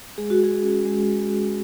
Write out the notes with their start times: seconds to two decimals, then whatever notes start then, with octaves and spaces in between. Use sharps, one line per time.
0.18 G#3 G#4
0.30 F#4
0.40 F#4 G#4
0.62 C#4
0.85 G#3